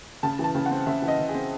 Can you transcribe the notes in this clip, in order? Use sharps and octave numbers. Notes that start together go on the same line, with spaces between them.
C#3 A5
E3
A5
C#3
F#5
C4
C#3 E5
E3
D#5
C#3
G#4
C4